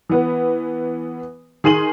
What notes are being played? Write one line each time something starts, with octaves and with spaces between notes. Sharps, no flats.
E3 B3 B4
D#3 G#4 C6 D#7 F#7